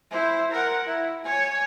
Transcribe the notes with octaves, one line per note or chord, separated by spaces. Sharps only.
E4 C5
A#4 F#5
E4
C#5 G#5